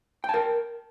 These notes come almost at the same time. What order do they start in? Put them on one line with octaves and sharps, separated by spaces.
G5 A5 A#4